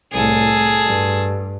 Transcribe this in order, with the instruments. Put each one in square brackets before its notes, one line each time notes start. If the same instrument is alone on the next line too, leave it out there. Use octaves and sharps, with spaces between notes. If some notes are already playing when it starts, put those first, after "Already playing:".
[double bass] C2 A2 [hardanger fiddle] G#4 A4
[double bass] G2